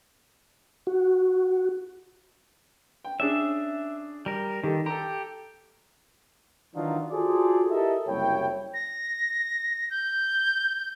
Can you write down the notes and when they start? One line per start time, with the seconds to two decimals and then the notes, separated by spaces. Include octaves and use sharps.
0.87 F#4
3.04 G5
3.20 C#4 D4 G#4 E5
4.26 G3 A#4
4.64 D#3 G4 A4
4.86 G4 A4 A#5
6.75 D#3 E3 F#3 D4 D#4 F4
7.11 F4 F#4 G#4 A4 C5 D5
7.70 E4 G4 A4 A#4 D#5 E5
8.07 F#1 C2 E4 C#5 G5
8.74 A#6
9.90 G6